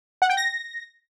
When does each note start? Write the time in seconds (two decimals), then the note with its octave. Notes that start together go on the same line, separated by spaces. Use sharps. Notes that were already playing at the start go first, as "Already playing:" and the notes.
0.22 F#5
0.29 G5
0.37 A#6